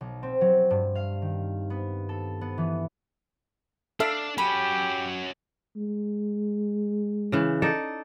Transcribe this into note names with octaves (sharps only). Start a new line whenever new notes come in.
B1
C4
F#3
G2
F5
D#3
B3
A4
B3
E3
D4 A4 E5 F5 A5
F#3 C#4 G4 B5
G#3
C#3 E3
D#4 A4 D5